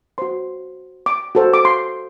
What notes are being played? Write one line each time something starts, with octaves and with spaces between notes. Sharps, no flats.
F#4 C5 C6
D6
F#4 A4 C5
D6
C6